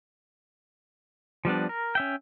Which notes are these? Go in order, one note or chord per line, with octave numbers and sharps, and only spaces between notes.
F3 G3 B3 D4
A#4
C#4 E5 G5